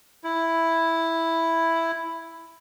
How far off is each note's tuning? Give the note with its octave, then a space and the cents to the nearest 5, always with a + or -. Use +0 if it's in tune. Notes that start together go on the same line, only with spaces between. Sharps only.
E4 +0